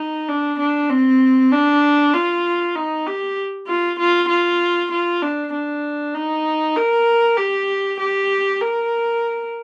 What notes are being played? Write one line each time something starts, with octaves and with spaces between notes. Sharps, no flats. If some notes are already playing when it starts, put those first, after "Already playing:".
Already playing: D#4
D4
D4
C4
D4
F4
D#4
G4
F4
F4
F4
F4
D4
D4
D#4
A#4
G4
G4
A#4